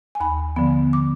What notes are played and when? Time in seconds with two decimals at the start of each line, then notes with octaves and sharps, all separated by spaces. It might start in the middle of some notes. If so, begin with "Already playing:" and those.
0.15 G#5
0.20 D#2 B5
0.56 D3 F3 B3
0.93 D6